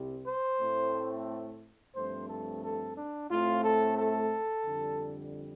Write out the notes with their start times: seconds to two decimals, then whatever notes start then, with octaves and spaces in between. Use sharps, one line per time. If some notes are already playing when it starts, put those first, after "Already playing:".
Already playing: C2 C3 G3 C4
0.26 C5
0.61 A2 A3 C4
1.95 G2 F3 A3 C4 C5
2.29 A4
2.63 A4
2.96 D4
3.31 A2 A3 C4 F4
3.64 A4
3.98 A4
4.65 F2 D3 G3